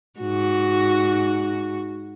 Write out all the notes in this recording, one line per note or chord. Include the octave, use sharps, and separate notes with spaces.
G#2 F#4